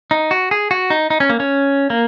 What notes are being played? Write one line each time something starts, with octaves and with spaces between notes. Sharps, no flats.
D#4
F#4
G#4
F#4
D#4
D#4
C#4
A#3
C#4
A#3